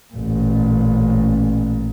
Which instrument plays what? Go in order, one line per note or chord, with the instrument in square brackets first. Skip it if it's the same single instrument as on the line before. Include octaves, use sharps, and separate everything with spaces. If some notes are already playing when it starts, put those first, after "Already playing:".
[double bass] A1 A#2